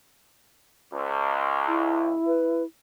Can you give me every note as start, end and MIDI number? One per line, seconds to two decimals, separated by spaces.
0.93 2.13 37
1.68 2.65 64
2.27 2.63 71